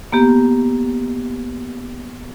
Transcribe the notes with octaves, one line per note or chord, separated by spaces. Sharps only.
A#3 B3 G4